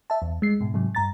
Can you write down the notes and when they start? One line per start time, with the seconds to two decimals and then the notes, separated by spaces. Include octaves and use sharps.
0.10 E5 A5
0.22 E2
0.42 G#3 C7
0.60 G#2 B2
0.74 G#2 C3 F#3
0.95 G2 A#5 A6